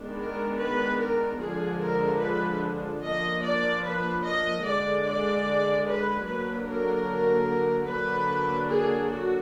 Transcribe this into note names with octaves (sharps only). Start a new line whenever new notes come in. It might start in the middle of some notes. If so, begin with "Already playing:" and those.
Already playing: D#3 G#3 B3 D4
A#4
B4
A#4
D3 F3 G#3 D4 G#4
A#4
B4
F3 A#3 D4 D#5
D5
B4
D#5
D3 G#3 D4 D5
D5
B4
D3 F#3 A#3 D4 B4
A#4
D3 F#3 A#3 D4 B4
G#4
F#4